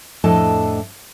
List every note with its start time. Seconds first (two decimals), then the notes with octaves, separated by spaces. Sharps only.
0.24 F2 A2 D4 A4 D#5 A5